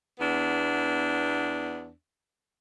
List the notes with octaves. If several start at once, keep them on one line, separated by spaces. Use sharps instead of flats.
E2 B3 D4